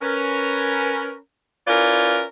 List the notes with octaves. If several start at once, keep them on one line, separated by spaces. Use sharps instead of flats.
C#4 A#4 B4
C#4 E4 F4 A#4 B4 D5